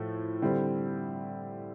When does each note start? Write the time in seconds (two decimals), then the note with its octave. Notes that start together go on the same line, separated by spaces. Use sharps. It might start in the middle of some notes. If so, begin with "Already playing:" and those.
Already playing: A2 F3 A3
0.42 D3 G3 C4 E4